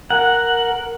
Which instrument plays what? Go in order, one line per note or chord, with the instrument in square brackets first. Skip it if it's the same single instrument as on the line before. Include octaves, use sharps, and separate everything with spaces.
[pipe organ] A#4 [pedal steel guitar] F#5